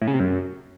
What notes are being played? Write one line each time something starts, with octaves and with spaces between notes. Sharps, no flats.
A2
C#3
C3
F#2